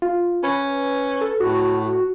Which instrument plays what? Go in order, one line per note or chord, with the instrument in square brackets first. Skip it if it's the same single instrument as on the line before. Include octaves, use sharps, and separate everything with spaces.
[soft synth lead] F4
[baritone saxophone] C#4 [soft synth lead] B4
[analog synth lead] A4
[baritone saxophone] A2 [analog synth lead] F#4